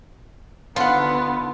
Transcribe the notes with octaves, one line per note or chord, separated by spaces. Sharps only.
D3 D#3 F3 B3 F4 F#5